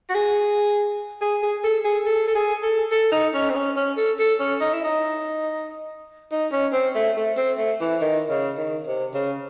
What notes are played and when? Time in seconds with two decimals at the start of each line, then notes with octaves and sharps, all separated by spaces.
0.10 F#4
0.14 G#4
1.21 G#4
1.43 G#4
1.64 A4
1.85 G#4
2.05 A4
2.27 A4
2.35 G#4
2.63 A4
2.92 A4
3.12 D#4
3.34 C#4
3.50 C4
3.55 C#4
3.77 C#4
3.97 A4
4.19 A4
4.40 C#4
4.61 D#4
4.73 E4
4.84 D#4
6.32 D#4
6.52 C#4
6.73 C4
6.95 A3
7.17 A3
7.37 C4
7.58 A3
7.80 E3
8.01 D#3
8.29 C#3
8.58 D#3
8.87 C3
9.14 C#3